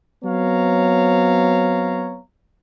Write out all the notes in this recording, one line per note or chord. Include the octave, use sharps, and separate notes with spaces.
F#3 B3 C4 C#5 F5 A#5